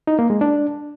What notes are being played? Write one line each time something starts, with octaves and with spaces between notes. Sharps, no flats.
D#4
A#3
G#3
D4